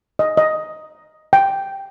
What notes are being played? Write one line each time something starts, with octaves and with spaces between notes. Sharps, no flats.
D#5
D#5
G5